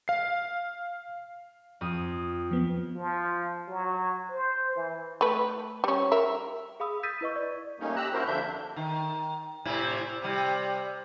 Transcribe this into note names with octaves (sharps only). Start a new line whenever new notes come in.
F5 C7
F2 D#6
F3 B3
F3
F#3
C5
E3
A3 B4
G3 C#4
A#4 E5
G#4 F5 B5 D#6 E6
D#6 E6 G6 A6 B6 D#7
E4 B4 D#5 C#6
D5
G3 A3 A#3 C#4 D#4
G4 A#5 E6 F#6
C#4 E4 F#4 A#4 C5
F2 D3 A#3 D4 E5 G6
D4
D#3
A2 C3 E4
C3 G3